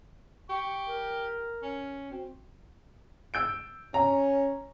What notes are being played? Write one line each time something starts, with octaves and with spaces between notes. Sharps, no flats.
G4 C#6
A#4
C#4
C4 F#4
E6 G6 D7
C#4 A#5